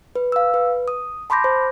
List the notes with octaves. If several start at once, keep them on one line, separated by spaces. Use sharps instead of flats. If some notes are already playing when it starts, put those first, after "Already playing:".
B4
F5 E6
B4
D#6
A5 B5 C6 D6 G6 A#6
C5